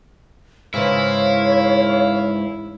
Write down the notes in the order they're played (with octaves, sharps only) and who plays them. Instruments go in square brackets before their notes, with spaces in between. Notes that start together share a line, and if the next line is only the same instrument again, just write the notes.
[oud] G#2 C#3 E3 [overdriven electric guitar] E4 [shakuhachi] C#5 [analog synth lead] F5